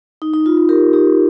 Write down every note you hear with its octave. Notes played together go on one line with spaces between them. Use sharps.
D#4
D#4
F4
F4
G4 A#4
D#4 G4